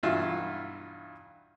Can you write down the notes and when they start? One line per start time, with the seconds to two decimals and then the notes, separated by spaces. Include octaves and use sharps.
0.03 B1 G2 E3 F4 F#4 E5